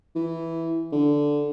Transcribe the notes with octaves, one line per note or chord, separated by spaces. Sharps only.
E3
D3